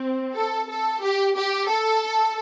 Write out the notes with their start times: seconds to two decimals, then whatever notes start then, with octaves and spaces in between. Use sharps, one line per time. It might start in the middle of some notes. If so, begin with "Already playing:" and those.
Already playing: C4
0.34 A4
0.68 A4
1.01 G4
1.35 G4
1.68 A4